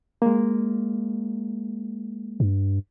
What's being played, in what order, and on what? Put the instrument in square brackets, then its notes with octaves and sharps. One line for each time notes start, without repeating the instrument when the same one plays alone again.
[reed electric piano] G#3 A#3
[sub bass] G2